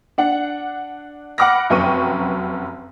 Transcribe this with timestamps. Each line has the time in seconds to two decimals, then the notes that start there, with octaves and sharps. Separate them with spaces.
0.18 D4 F#5
1.38 F#5 B5 D6 F6 A#6
1.70 F1 F#2 B4 G5 C#6 D#7